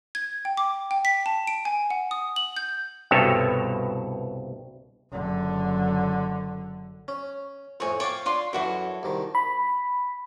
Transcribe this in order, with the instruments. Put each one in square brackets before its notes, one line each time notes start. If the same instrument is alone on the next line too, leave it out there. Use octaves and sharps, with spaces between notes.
[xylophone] G#6
G5
D6
G5
B6
A5
D7
G#5
F#5
D#6
F#7
G6
[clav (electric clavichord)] C2 G2 B2 A4 C#5
[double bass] F#1 D3
[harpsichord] C#4
[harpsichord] F2 A2 [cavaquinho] C#5 G#5
[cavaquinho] C#5 F5 [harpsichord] G5 A5 D6
[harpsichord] D4 [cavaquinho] F4 C6
[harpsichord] F#2 E3 [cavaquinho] E4 F#4 A4
[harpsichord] C2 D#3
[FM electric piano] B5